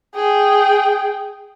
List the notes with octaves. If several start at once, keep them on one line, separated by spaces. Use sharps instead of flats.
G#4 G5